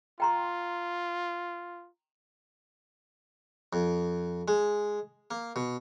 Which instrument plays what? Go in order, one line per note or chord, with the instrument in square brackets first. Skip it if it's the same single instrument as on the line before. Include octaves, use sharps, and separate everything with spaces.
[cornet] F4 [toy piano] G5 A#5 C6
[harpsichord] F2
G#3
A#3
B2